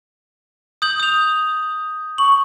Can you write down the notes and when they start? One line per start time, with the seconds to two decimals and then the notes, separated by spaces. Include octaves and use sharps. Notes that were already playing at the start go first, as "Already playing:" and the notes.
0.82 D#6 G6 F#7
1.00 D#6 F7
2.18 C#6 F#7